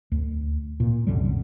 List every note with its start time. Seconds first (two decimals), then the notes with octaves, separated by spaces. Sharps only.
0.12 D2
0.80 A#2
1.07 C2 F#2 D3 G3